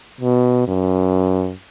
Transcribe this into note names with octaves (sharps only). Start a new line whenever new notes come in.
B2
F#2